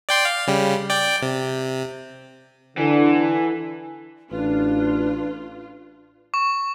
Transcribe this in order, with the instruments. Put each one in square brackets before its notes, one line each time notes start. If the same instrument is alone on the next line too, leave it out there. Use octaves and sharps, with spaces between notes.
[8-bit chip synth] D5 G5 C6
F5
C#3 G3
D5 G5
C3
[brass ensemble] D3 [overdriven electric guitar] E3
[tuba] A1 [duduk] D4 [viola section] F4 [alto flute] B4
[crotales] C#6